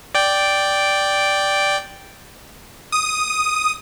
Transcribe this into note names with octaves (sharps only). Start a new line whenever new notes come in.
D5 G5
D#6